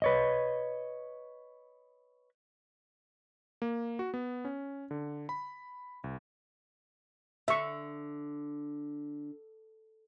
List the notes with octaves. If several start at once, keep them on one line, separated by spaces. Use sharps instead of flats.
B4 C#5 D#5
A#3
F#4
B3
C#4
D3
B5
C2
D3 E5 C#6